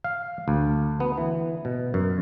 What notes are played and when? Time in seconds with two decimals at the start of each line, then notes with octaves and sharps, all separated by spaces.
0.04 F5
0.48 D2
1.00 B3
1.17 E3
1.65 B2
1.94 F#2